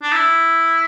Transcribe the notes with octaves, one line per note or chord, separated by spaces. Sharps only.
D4
E4